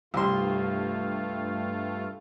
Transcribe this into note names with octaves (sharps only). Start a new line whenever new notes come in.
C2 G2 A3 F4 C6